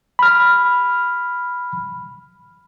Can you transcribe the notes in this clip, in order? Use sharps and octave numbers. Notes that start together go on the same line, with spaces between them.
B5 F6